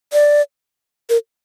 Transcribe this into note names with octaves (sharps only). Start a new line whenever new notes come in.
D5
A#4